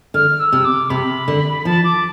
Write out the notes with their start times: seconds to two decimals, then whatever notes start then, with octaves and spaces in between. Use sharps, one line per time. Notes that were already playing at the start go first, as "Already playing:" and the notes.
0.14 D3 F6
0.40 E6
0.52 C3
0.65 D6
0.90 C3 B5
1.28 D3
1.65 F3 A5
1.84 D6